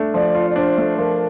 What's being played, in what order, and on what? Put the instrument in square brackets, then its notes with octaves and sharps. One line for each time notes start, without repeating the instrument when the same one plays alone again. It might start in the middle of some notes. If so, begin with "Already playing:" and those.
Already playing: [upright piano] A3 D4
[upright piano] F3 [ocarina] D5
[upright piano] F4
[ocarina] D5
[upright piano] D4 [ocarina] C5
[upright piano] A3
[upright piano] F3 [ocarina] A#4